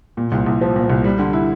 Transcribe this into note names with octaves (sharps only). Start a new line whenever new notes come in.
A#2
C2
C2
F3
A#2
C2
G3
D3
E4